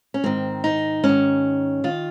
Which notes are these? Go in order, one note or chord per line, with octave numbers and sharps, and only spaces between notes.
C#4
G#2 D#3 C4
D#4
G#2 C#4
D#3
D#3 F4